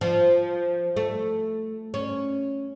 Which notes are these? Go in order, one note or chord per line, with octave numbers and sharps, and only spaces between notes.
F3
A3
C#4